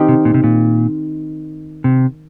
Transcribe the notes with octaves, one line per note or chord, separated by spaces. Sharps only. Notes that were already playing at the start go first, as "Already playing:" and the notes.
Already playing: D#3 C4 D#4 G4
C3
A#2
C3
A#2
C3